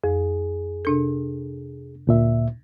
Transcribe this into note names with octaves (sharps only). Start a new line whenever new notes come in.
F2 G#4
C3 D4 A4
D2 A#2 E5